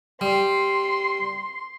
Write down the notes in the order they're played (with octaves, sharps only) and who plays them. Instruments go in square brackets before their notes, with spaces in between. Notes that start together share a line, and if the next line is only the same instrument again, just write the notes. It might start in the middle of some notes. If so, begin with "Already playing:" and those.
[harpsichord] G3 [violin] C6